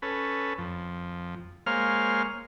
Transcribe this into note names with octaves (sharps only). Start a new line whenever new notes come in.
C#4 A4 B4
F2
G#3 A#3 C5 C#5 F5 F6